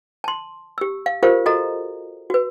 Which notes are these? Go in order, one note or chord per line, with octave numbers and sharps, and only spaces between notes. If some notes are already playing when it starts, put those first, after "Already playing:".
A5 C6
G4 E6
F5
F4 G4 A#4 C5 F5
F#4 A4 D#5 A#5
F#4 B4